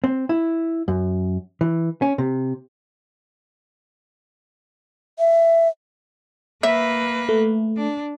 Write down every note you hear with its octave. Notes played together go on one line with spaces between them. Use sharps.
C4
E4
F#2
E3
C#4
C3
E5
A#3 B4 E5
A3
D4